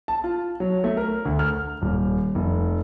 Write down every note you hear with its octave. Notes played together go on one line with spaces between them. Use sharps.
A5
F4
F#3
A3
A#4
D2
F6
D#1
F1